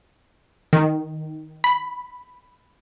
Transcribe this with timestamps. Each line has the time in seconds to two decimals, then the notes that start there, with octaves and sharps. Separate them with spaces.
0.73 D#3
1.64 B5